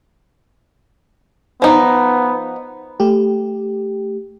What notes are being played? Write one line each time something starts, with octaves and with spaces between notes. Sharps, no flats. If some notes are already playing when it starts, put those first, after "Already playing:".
F3 B3 D#4
A3 G4